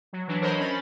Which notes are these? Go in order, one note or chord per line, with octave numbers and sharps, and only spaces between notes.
F#3
E3 F#3 D4
A#4 C5 C#5 D#5 B5
C#4 B5 A6